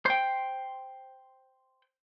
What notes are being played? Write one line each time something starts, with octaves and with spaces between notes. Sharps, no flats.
C5 G5